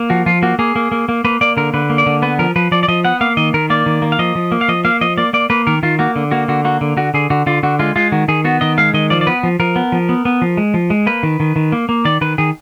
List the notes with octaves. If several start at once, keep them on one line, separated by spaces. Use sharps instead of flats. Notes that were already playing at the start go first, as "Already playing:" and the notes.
Already playing: A#3
F3 F#4
F3 F4
A#3 F#4
A#3 G#4
A#3
A#3
A#3
A#3 B4
A#3 D5
D3 A#4
D3 B4
A#3
D5
D3
B3 B4
F3 A#4
F3 B4
F3 D5
D5
F3 D#5
B3 F#5
A#3 F5
D#3 D#5
D#3 A#4
A#3 D5
D#3
A#3
F5
F3 D#5
F3
A#3
F5
F3 D#5
A#3 F5
F3 D#5
A#3 D5
A#3 D5
A#3 B4
D#3 A#4
D#3 F4
A#3 F#4
D3
A#3 F#4
D3 F#4
A#3 F#4
D3
D3 F#4
D3 G#4
D3 F#4
D3 F4
D3 F#4
G#3 F4
G#3 F4
D#3 F#4
D#3 G#4
B3 F#4
D#3 D#5
G#3 F5
D#3 D#5
F3 D5
D5
B3 B4
F3
F3 A#4
B3
F3
B3
B3
F3
G#3
F3
G#3
A#3 B4
D#3
D#3
D#3
A#3
A#3
D#3 D5
D#3 B4
D#3 G#4